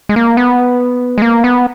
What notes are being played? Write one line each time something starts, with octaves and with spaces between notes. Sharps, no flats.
G#3
A#3
B3
G#3
A#3
B3